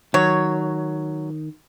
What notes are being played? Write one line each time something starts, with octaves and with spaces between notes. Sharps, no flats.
D#3 F#3 C#5